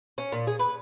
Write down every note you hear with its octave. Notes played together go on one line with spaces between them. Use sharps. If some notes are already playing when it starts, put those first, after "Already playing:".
C#4
A#2
G#4
B4